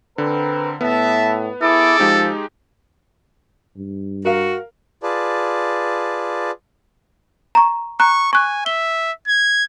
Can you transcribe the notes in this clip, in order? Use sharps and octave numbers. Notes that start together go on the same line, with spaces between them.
D3 C4 A#4 B4
A2 B3 E5 A5
E4 G#4 A4 D6
F3 G#3 D#4 G4
G2
F#4 A#4 F5
F4 G#4 B4 D5 A5
A#5 C#6
A#5 C#6 F#6
G#5 C#6 F#6
E5 G7
G#6